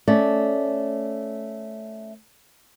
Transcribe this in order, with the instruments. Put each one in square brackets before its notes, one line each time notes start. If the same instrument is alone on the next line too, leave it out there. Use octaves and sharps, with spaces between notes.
[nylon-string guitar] A3 C#4 D5